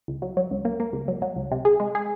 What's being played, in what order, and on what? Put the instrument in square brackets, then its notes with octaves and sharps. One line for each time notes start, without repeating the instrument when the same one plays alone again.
[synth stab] C#2
F#3
F#3
C#2
A#3
A#3
C#2
F#3
F#3
C#2
C3
G#4
G#3
G#4